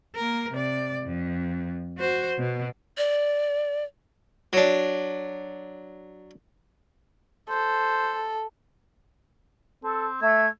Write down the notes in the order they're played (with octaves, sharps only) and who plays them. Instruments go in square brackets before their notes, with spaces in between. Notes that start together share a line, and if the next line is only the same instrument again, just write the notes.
[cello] A#3 A#4
C3 D5
F2
F#4 C5
B2
[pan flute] D5
[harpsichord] F#3 D4
[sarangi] A4 [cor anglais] C5
[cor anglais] C4 [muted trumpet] A4
[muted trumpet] A3 [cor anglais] E5 [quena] G#6